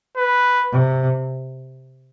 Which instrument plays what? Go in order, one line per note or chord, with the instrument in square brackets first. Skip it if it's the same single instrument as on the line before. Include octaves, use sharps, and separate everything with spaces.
[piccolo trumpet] B4
[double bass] C3